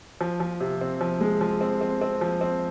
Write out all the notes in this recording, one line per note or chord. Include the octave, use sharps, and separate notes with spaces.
F3
F3
C3
C4
F3
G#3
F3
C4
C4
C4
F3
C4